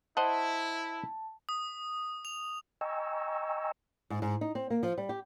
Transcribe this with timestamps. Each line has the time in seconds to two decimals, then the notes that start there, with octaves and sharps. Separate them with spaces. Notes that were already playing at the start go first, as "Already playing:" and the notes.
0.17 E4 C5 D#5 F#5 A5
1.49 D#6
2.25 F7
2.81 D#5 G5 G#5 A#5 C#6 E6
4.10 G#2
4.22 G#2
4.41 D#4
4.55 C4
4.70 A#3
4.83 F3
4.98 G3
5.09 G4